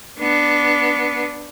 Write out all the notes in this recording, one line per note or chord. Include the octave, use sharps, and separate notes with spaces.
B3 D4